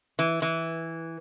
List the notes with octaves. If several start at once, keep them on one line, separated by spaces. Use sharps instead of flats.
E3
E3